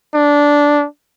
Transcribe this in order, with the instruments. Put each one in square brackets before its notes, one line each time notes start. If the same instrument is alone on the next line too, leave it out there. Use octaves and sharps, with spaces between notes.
[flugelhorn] D4